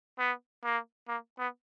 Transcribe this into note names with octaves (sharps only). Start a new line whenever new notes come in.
B3
A#3
A#3
B3